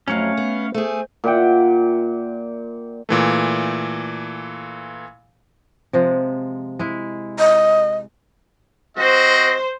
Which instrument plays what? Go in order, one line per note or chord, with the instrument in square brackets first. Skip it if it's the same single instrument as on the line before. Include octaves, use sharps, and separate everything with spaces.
[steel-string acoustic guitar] F2 F#3 [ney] A3 [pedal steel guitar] C#4 C#5 F5
[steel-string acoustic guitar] B3
[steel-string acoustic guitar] A3 G#4 [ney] C5
[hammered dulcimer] A#2 E5 F#5 G5
[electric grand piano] A#2 E3 A3
[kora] C3 F3 G#3
G#3 E4
[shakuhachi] D#5
[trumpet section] C4 F#4 D#5 [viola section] C5